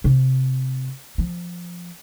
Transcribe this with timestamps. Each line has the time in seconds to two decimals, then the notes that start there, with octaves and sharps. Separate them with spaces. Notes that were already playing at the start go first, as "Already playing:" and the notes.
0.04 C3
1.18 F3